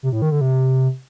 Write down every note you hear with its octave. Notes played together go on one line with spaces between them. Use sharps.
C3
A2
D#3
D3
C3